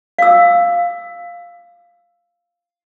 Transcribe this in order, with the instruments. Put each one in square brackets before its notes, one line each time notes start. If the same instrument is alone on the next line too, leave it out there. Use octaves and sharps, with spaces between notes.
[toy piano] F5 E6